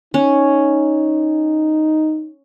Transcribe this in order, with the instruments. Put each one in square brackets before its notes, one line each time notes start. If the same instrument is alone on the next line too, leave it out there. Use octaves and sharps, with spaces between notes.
[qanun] C#4 [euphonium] D#4